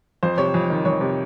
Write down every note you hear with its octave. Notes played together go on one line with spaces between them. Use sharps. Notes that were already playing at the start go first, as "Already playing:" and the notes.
F2 C5
C3 C#5
F2
D#3
F2 C#5
C3